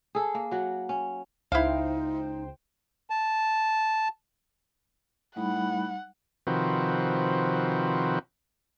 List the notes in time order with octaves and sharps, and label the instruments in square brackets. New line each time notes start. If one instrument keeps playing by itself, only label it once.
[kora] G#4 A4
A#3
F#3 F#4
C#4
[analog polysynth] C#2 C5 G5 [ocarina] D#4 [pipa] E4 F5
[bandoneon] A5
[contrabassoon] A2 [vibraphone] G3 D#4 B5 [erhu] F#5
[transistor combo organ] C3 D#3 F3 C4 F#4 B4